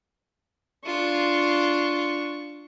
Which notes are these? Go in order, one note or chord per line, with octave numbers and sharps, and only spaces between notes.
D4 F4 C#6